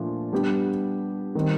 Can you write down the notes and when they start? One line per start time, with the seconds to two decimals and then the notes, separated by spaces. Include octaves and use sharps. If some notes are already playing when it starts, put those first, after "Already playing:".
Already playing: A#2 F3 A3 D4
0.33 G3 B3 D4 G4
1.35 D#3 G3 C4